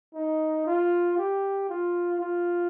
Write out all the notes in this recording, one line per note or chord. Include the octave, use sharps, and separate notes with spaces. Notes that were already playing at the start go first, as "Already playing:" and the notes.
D#4
F4
G4
F4
F4